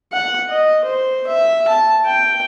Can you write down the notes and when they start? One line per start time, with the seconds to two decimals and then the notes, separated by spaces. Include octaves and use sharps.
0.13 F#5
0.49 D#5
0.85 C5
1.27 E5
1.68 A5
2.06 G5